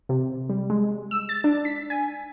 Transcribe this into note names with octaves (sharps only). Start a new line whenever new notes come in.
C3
G3
G#3
E6
A6
D4
B6
G#5